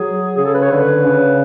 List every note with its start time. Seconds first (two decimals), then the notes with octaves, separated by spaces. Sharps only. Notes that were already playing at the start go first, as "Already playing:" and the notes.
Already playing: F#3 G#4
0.37 C#3 G#4
0.45 A4
0.54 B4
0.62 C#5
0.71 D3 B4
1.05 C#3